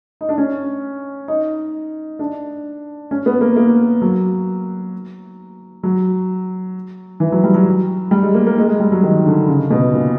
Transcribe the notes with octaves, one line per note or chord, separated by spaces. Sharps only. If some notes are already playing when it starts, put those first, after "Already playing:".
D#4
D4
C#4
D#4
D4
C#4
B3
A#3
A#3
F#3
F#3
E3
F#3
G3
F#3
G3
G#3
A#3
A#3
G#3
G#3
G3
F#3
D#3
D3
C#3
B2
A#2